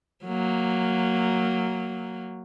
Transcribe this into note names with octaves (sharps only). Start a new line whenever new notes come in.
F#3 A#3